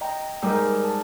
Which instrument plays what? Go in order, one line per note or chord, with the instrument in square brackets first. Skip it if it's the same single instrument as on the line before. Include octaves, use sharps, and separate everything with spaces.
[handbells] D#5 G5 A#5
[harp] G#2 G3 D#4 [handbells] A#4 E6
[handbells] A5